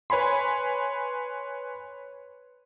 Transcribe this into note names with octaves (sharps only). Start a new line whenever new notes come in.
B4 C#5 G#5 B5 C6